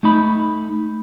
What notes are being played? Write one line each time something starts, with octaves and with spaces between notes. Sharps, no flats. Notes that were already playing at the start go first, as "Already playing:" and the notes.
A3 D#4 B5